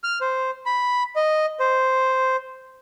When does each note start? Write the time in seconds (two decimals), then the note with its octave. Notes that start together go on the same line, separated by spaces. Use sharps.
0.04 F6
0.21 C5
0.66 B5
1.16 D#5
1.60 C5